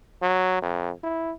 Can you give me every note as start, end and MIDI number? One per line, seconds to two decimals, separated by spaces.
0.22 0.61 54
0.62 0.91 41
1.04 1.32 64